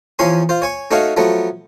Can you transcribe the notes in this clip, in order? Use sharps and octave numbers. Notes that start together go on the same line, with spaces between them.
E2 F3 C#4 C#5 G#5 C6
F4 C5
C#5 G#5 C#6
A3 C#4 D#4 F#4 C#5 F5
F3 F#3 A3 B3